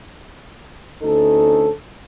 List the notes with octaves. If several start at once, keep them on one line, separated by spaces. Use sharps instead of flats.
D2 C#4 D#4 A4